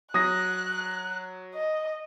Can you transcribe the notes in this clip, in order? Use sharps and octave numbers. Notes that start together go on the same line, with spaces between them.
F#3 D#6 F#6 A#6
D#5